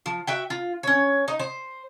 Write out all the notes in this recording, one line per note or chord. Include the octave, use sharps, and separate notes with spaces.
F3
F#4 E5 G5
F4
C#4 C#5
D#4
C5